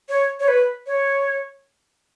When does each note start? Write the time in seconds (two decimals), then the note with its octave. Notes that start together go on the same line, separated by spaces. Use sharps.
0.09 C#5
0.40 C#5
0.48 B4
0.87 C#5